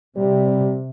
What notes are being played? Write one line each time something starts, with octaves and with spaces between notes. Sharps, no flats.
C3 G3